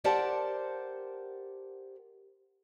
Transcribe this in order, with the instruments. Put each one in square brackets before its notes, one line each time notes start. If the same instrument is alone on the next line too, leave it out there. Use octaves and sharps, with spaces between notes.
[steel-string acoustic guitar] G4 A#4 C5 D5 F#5 A5